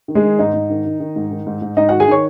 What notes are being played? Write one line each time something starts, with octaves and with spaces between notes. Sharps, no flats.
D#3
G#3 G#4
D#3
G#2 D#4 D#5
G#2
D#3
D#3
D#3
G#2
D#3
G#2
G#2
G#2 D#4 D#5
D#3 F#4 F#5
G#4 G#5
D#3 C#5 C#6